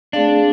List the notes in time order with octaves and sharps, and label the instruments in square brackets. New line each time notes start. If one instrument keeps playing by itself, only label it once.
[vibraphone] A3 C4 G#4 D5 F5 [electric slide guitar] D4